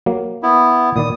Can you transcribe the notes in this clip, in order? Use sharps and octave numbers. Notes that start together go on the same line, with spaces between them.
F#3 A#3
B3 E4
A#2 D#3 D5 D#6